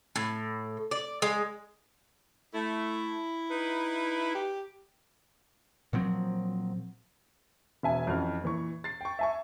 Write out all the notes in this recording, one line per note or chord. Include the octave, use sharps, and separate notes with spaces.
A2
D5
G#3
A3 E4
D#4 B4
G4
A#2 F3 F#3 C4
E1 E5 G#5
F2 E3 C#4 F#4 F6
A#2 E3 C#6
A6 C7
G5 C#6
E5 G#5 C#6